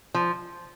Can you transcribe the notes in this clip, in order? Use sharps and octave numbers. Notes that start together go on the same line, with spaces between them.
F3